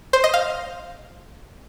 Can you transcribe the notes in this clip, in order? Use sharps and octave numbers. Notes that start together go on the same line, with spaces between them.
C5
D#5
F5